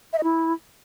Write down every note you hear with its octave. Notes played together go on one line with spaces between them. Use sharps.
E5
D#5
E4